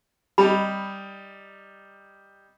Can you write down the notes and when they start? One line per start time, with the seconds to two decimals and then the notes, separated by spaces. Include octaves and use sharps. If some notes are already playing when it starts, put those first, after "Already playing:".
0.38 G3 D#4 B5